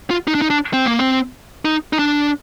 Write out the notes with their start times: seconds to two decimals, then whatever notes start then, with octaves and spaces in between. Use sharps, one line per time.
0.11 F4
0.27 D#4
0.35 D4
0.42 D#4
0.50 D4
0.73 C4
0.86 A#3
0.99 C4
1.65 D#4
1.93 D#4
1.99 D4